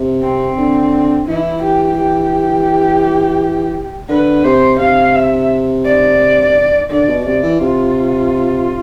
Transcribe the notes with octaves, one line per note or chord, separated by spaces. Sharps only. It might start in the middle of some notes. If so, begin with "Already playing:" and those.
Already playing: C3
C4
D3
E3 E4
G4
G4
D3 B4
C3 C5
C3 F5
E5
D5
D3 D5
B2
C3 D5
E3
C3 F4